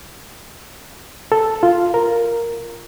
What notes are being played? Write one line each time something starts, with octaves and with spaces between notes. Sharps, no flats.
A4
F4
A#4